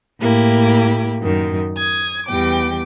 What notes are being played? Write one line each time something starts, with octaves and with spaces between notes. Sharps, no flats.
A2 A#3 E4 G4
F#2 D#3
D#6 G#6
E2 G3 G5 D6